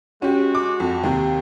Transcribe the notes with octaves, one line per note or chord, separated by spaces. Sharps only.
G#3 C#4 F#4 G4
D6
F2
D#2 C3